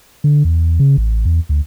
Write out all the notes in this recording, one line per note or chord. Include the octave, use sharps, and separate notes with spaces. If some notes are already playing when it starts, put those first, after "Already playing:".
D3
E2
C#3
A1
E2
D2